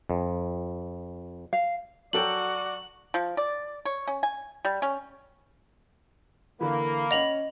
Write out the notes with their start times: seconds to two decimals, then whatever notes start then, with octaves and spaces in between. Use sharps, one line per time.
0.10 F2
1.53 F5
2.13 F#3 F#4 A4 D5 G5 F#7
3.14 F3
3.37 D5
3.86 C#5
4.08 C#4
4.23 G#5
4.65 G3
4.82 C#4
6.61 D3 E3 A#3 B5
7.11 C#4 D#5 F#5 F7 F#7